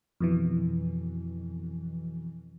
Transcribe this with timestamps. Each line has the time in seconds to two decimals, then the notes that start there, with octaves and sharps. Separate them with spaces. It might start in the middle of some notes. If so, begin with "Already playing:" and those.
0.20 F2 B2 E3